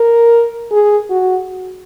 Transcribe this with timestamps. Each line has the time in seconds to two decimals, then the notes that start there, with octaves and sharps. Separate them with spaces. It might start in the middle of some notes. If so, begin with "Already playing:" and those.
Already playing: A#4
0.71 G#4
1.10 F#4